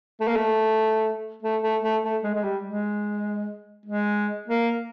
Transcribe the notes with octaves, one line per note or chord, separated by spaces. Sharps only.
A3
A#3
A3
A3
A3
A3
A3
G#3
G#3
G3
G#3
G#3
A#3